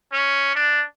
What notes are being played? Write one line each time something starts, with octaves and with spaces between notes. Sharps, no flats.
C#4
D4